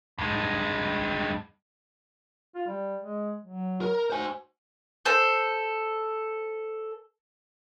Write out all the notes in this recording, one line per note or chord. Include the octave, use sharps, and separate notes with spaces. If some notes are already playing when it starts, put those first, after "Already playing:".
G2 G#3
F4
G3
G#3
F#3
A#4
F#4 C5 G#5
A4 C5